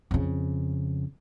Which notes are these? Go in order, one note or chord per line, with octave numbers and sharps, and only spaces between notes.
F2 C#3